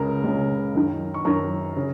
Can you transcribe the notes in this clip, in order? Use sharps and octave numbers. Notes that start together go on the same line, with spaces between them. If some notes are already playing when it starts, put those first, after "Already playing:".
Already playing: C#2 C#3 A#4
C#2 C#3
F#2 D#3
C#6
F#2 D#3 A#4 A#5
C#3